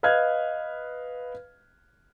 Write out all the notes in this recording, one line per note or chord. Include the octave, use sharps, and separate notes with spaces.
B4 D#5 F5 F6 F#6 G#6